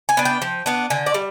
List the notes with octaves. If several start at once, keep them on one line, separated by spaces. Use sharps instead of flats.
G#5
B3 D4
G5
F3
B3 D4
D3 G#5
D5
G3